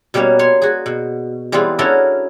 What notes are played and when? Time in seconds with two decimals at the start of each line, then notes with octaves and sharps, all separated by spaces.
0.14 B2 G3 A#3 B3 C#4
0.39 C#5 C6
0.62 F#4 G#4
0.86 B2
1.52 E3 G3 G#3 B3 C4 F4
1.79 C#4 D4 E4 F#4 A4 A#4